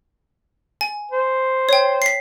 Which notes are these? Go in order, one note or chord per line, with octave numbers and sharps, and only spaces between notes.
G#5
C5
C#5 G5
B6 C7